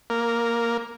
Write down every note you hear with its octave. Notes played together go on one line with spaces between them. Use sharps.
A#3